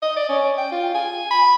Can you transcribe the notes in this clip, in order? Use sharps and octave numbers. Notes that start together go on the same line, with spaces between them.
D#5
D5
C#4
G5
F4
G#5
B5